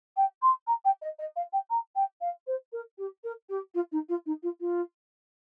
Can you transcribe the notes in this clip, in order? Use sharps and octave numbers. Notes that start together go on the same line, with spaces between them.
G5
C6
A#5
G5
D#5
D#5
F5
G5
A#5
G5
F5
C5
A#4
G4
A#4
G4
F4
D#4
F4
D#4
F4
F4